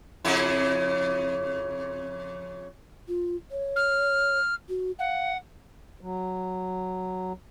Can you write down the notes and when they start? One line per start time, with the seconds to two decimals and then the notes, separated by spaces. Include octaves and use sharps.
0.25 F2 C#3 E4
3.08 F4
3.51 C#5
3.76 F6
4.69 F#4
4.99 F5 F#5
6.01 F#3